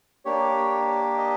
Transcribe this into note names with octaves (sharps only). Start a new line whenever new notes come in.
A#3 D4 G4 C#5
D#5